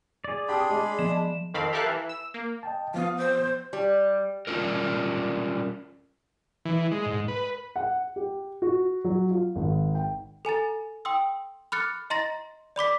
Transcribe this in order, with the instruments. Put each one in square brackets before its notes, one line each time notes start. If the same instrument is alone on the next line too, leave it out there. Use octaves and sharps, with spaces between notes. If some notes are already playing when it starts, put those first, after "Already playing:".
[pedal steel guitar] G#4 D5
[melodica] D4 B5 C6 [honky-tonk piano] G4 D#6
[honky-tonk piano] G#3
[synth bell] F3 E7
[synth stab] F2 D#3 C4 F5 B5
G4 A4 A#4 E5 F5 F#6
E3
E6
A#3
[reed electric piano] D#5 G5 A5
[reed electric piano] F3 B3 D#6 [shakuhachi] F5
[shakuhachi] C5
[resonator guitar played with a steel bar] G3
[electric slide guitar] G3 C#4 D4 F4 A#4
[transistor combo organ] E3
G#3
G#2
B4
[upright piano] F#5
G4
F#4
F#3
F4
G#1
G5
[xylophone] A4 G#5 A#5 A6
G5 C6 D#6 E6
B5 D6 F6 F#6 A6 C#7
D#5 A#5 C6 A6 A#6
D5 B5 D6 B6